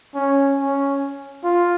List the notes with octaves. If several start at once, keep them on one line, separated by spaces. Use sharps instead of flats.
C#4
C#4
F4